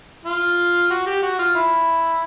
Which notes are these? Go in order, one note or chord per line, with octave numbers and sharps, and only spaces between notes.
F4
F#4
G4
F#4
F4
E4